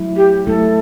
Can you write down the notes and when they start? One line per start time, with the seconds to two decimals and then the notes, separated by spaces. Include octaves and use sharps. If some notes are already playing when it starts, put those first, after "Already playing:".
Already playing: F#3 A3 E4
0.16 G4
0.46 F#3 A3 E4 A4